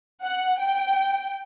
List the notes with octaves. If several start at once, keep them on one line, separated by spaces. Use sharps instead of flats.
F#5
G5